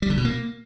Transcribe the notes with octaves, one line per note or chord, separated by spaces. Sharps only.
G3
D3
B2
A#3